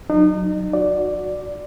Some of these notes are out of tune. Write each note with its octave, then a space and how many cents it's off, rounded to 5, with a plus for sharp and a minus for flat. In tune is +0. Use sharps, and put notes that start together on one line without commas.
F#3 +0 D#4 -35
F#4 -15 D5 +0